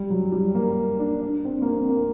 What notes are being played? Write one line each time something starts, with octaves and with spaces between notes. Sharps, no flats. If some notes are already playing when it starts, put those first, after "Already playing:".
Already playing: G3
F#3
G3
A#3
D4
D4
C4
A#3
C4
A#3